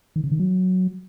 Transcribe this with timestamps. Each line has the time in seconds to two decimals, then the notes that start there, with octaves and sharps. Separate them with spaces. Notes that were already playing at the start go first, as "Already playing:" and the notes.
0.16 D#3
0.24 C#3
0.31 D#3
0.39 F#3